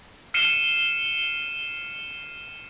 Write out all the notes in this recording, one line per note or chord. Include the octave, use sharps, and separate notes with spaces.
F6 C7 C#7 D#7 E7 G7